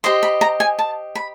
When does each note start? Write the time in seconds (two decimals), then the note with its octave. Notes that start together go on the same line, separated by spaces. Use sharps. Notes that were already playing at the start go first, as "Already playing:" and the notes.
0.04 G4 C5 D#5 C6
0.23 B5
0.41 A#5
0.60 G#5
0.79 A5
1.15 B5